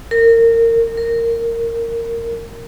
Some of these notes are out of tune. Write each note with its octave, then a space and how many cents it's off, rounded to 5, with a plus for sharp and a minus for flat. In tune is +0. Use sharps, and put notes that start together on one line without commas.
A#4 -25
A#4 -15